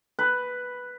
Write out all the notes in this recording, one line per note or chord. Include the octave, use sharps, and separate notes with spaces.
B4